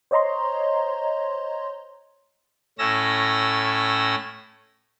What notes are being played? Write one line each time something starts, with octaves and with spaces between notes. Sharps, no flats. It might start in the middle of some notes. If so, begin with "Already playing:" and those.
C5 C#5 D#5 A#5 C6
A2 C#4 E6 A#6